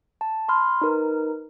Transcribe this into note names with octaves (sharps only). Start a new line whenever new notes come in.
A5
B5 C6 F6
D#4 A#4 B4